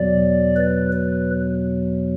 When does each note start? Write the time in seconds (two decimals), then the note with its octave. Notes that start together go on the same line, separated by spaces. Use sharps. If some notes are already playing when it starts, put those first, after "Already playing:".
Already playing: E2 B2 F#3 D5
0.56 B4
0.92 B4